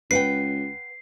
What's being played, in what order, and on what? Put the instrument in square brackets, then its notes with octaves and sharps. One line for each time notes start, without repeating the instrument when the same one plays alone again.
[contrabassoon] C#2 [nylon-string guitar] B4 F#5 G5 [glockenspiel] C7